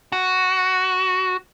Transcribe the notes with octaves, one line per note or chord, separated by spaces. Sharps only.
F#4